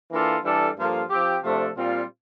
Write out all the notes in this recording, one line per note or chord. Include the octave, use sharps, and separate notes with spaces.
E3 A#3 D4 F4 A4
E3 G3 D4 A4
G2 F3 A#3 F4 A4
F3 C4 G4
C3 F3 A3 D4 A4
A#2 G3 C4 F4